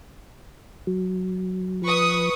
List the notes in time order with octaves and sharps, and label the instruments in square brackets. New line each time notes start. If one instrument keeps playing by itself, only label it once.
[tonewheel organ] F#3
[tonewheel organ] F3 [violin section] B4 C#6 D#6